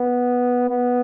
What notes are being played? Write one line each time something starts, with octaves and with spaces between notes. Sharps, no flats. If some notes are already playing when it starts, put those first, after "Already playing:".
Already playing: B3
B3